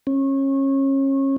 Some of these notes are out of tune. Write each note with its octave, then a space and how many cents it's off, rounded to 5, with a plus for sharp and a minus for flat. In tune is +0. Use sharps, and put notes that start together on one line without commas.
C#4 -30